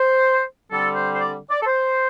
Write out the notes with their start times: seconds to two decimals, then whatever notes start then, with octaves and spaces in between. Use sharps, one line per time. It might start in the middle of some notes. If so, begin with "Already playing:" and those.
Already playing: C5
0.71 D3 G3 C4 A4
0.95 C5
1.14 C5
1.19 D5
1.49 D5
1.61 A4
1.66 C5